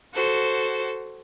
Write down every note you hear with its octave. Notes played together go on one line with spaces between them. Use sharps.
F#4 A4 C5